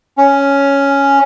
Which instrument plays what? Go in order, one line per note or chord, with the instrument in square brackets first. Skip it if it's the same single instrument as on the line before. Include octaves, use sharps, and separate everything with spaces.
[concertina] C#4